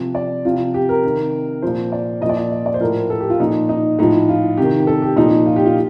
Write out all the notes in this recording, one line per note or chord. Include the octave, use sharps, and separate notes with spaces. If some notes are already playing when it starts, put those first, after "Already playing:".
Already playing: C3 F3
D5
C3 F3 F4
G4
A#4
C3 D#3
A#2 F3 C5
D5
A#2 F3 D5 D#5
D#5
D#5
D5
C5
A2 F3 A#4
A4
G4
F4
A#2 F3 D#4
D#4
A2 F3 D#4
F4
C3 D#3 G4
A4
G4
A#2 F3 D#4
F4
G4
F4